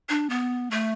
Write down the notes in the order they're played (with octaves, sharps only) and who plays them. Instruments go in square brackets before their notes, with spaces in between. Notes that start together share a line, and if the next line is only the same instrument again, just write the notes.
[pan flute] D4
B3
A3